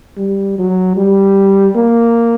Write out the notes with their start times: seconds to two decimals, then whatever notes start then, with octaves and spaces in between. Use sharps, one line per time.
0.18 G3
0.58 F#3
0.97 G3
1.76 A#3